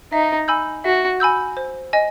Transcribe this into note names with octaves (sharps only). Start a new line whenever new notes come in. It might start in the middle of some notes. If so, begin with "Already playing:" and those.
D#4 E5
G#5 B5 E6 G6
F#4 E5
G#5 B5 E6 G6
C5
D#5 G#5